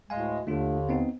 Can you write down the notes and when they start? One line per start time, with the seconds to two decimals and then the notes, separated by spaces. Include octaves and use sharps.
0.10 D2 A2 G#3 F5 G#5
0.47 D#2 D3 A3 D4 F4
0.89 B3 C4 D#4